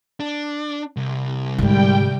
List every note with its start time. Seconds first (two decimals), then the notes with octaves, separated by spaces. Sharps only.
0.20 D4
0.97 C2
1.59 G#2 D3 G3 G5